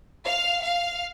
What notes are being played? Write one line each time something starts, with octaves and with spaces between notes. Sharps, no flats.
F5
F5